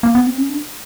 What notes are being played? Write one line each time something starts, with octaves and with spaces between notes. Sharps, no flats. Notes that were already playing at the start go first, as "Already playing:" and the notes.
A#3
B3
C4
C#4
D4